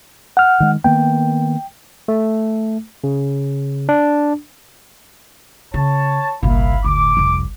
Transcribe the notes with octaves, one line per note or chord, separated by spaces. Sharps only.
F#5 F6
D#3 G#3
D#3 A#3 B3 G5
A3
C#3
D4
C#3 C#5 A5
G1 C2 A#2 E4 F5 B5
D2 A2 D6
C2 F2